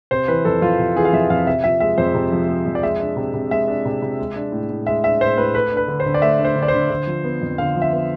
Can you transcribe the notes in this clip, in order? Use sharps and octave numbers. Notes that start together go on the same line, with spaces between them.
C3 C5
E3 B4
F2 A4
F2 F4
C3
E3 G#4
F5
F2 E5
F2 F5
C3 E5
F3 E5
G#3 E5
F2 C5
C3
F3
G#3
F2
D5
G#3 E5
D4
C3
C3
G#3 E5
D4
C3
C3
G#3
D4
A2
A2
G#3 E5
D4 E5
A2 C5
A2 B4
A3 B4
D4
B4
D3
C5
D3
D5
A3 E5
D4 C5
D3
D5
C5
D3
D3
F3
B3
F2
D3 F5
F3
E5
B3